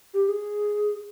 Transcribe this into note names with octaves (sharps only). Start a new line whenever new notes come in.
G4
G#4